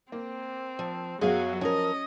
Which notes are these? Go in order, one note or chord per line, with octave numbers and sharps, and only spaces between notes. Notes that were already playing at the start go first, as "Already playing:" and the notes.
A#3 C4
F3
F#2 F#3 B3 F#4 G#4 F5
F3 C#4 A#4 D#5